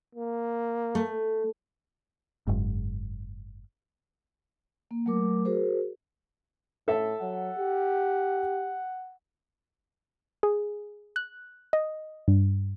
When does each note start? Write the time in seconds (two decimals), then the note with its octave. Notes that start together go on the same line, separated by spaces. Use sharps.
0.15 A#3
0.95 A3
2.47 F#1 G#2
4.91 A#3
5.06 F#3 A3 A#4 D6
5.45 F#4 G#4 A#4 C5
6.88 A2 A4 E5
7.21 F#3 F#5
7.58 G4
10.43 G#4
11.16 F#6
11.73 D#5
12.28 G2